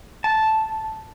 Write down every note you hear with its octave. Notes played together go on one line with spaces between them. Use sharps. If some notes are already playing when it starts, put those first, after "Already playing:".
A5